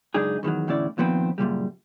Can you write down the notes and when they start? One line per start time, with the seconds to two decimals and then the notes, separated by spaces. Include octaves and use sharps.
0.14 C#2 F#2 D4 D#4 G#4
0.43 E2 D#3 F3 F#3
0.67 E2 A2 D3 C#4 E4 D5
0.98 A#2 D#3 F3 B3 C4
1.38 F#2 A#2 C#3 G3